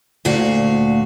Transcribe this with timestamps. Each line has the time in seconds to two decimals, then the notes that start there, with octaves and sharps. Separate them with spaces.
0.25 D2 A#2 F#4 F5